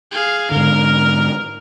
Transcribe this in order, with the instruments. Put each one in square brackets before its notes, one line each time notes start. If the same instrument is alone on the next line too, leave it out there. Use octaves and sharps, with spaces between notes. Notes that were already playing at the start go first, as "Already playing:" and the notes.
[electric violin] G#4 F5
[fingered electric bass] G#2 D3 [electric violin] A#4